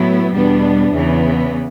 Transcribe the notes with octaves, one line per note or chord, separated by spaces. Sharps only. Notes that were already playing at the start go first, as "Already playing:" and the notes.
Already playing: A2 F#3 B3 E4
E2 B2 G3 B3 D4
E2 C#3 E3 B3